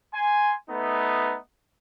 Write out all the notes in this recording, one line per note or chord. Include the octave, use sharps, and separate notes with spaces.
G#5 C6
A3 B3 D#4 B4